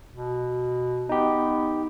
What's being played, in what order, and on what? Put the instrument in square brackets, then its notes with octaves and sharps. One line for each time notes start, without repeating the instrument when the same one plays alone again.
[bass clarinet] B2
[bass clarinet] B3 [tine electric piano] D#4 G4